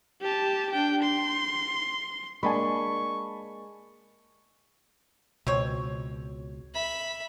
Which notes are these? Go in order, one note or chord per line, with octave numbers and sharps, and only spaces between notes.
G4 A5
D4 G5
C6
G#3 A#3 D4 G#5 A5 B5 C#6
C#2 B2 C4 C#5
E5 B5